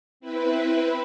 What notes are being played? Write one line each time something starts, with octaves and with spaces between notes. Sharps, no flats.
C4 E4 B4